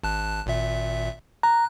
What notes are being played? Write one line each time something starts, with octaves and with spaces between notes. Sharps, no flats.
G#1 A5 F#6
G#1 A#2 E5
A#5 F#6